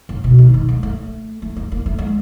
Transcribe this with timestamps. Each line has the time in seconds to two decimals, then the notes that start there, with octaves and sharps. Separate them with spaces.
0.09 C#3
0.24 B2
0.39 D#3
0.54 D#3
0.69 G#3
0.83 A3
1.42 A3
1.57 G#3
1.72 A#3
1.86 A3
1.99 G#3